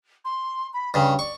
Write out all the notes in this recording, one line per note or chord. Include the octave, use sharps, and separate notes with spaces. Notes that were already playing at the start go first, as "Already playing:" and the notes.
C6
B5
G2 C#3 C#6
D5 C#6